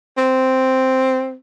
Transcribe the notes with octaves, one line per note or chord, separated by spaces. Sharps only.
C4